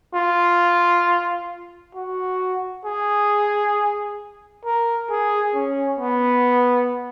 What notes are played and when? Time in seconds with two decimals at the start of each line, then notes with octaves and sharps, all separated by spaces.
0.14 F4
1.95 F#4
2.85 G#4
4.65 A#4
5.09 G#4
5.55 C#4
5.99 B3